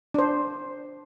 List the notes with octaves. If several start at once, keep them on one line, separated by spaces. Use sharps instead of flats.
D4 C5